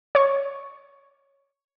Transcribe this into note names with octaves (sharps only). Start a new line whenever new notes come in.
C#5 C#6